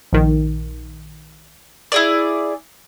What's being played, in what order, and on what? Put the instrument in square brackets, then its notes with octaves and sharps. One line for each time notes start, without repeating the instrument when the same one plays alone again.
[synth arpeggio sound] A#1 D#3
[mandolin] E4 G#4 D5